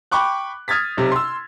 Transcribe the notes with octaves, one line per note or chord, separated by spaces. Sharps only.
G5 B5 C#6 D6 F#6
D#6 F6 G#6 A6 B6
B1 C3
C6 E6